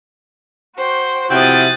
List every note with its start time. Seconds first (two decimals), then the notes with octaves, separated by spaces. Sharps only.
0.75 F#4 C5 G5
1.31 C3 F3 E4 F#4 G5 D#6 A6